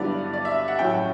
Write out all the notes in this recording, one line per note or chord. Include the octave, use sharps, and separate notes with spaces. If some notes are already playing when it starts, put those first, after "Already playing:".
Already playing: G2 D3 F#3 B3 E4 D5
D5
E5
F#5
A2 F#3 C#4 E4 G5